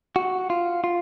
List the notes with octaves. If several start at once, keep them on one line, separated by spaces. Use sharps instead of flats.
F#4
F4
F4